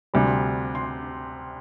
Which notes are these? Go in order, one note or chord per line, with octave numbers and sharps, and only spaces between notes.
D2 C3 G3
C6